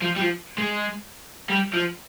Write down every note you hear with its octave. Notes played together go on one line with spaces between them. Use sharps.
F3
G3
F3
G#3
G3
F3